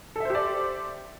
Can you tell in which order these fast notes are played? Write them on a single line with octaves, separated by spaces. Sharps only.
A4 E5 C5 G4 D5